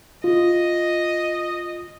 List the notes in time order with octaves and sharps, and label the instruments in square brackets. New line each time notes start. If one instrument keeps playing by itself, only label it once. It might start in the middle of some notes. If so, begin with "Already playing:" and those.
[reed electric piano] F4 [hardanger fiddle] D#5